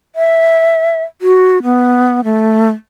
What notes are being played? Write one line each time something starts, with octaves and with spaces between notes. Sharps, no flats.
E5
F#4
B3
A3